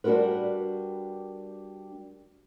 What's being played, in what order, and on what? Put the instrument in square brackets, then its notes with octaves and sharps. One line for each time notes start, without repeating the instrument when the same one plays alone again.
[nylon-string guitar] G3 D4 F#4 A#4 B4